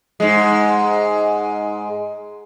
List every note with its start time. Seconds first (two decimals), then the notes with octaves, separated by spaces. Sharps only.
0.20 G#2 G#3